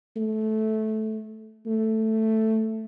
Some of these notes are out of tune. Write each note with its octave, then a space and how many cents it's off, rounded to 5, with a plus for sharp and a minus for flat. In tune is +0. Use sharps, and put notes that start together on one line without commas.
A3 -15
A3 +5